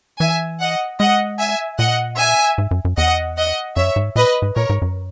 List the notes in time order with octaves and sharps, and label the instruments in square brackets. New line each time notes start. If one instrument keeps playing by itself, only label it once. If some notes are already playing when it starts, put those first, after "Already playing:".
[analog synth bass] E3 [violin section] E5 G#5
[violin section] D#5 F#5
[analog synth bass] G#3 [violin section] D#5 F#5
[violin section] E5 G#5
[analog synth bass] A#2 [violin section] D#5 F#5
[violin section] E5 G#5
[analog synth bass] G#2
F#2
F#2
[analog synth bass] E2 [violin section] D#5 F#5
[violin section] D#5 F#5
[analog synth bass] F#2 [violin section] C#5 E5
[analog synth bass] G#2
[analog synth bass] A#2 [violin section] B4 D#5
[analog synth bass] G#2
[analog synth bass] A#2 [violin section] A#4 C#5
[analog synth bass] G#2
F#2